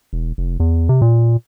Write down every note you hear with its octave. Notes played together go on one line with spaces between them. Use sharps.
E1
F1
E2
C3
A#2